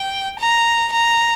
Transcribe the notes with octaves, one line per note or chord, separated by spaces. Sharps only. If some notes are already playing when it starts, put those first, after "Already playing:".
Already playing: G5
A#5
A#5